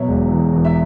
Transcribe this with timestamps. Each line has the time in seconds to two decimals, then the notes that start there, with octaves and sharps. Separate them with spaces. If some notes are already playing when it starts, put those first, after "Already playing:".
Already playing: B2 F#3 C#5 E5
0.08 E1
0.30 E2
0.53 E2
0.65 E5